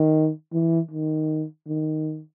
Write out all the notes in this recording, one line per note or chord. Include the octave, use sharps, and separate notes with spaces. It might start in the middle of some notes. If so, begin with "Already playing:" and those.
Already playing: D#3
E3
D#3
D#3